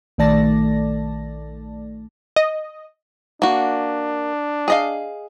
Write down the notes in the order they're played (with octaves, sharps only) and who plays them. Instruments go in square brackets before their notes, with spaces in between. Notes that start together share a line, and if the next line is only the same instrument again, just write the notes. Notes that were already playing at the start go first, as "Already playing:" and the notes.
[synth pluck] A#1 D#3 A3 D5 A5 A#6
[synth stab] D#5
[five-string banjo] A#3 F#4 [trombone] D4
[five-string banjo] G#4 D#5 F5